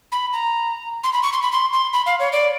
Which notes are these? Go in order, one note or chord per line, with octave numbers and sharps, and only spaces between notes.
B5
A#5
C6
B5
C#6
C6
B5
C6
C6
B5
F5
C#5
D5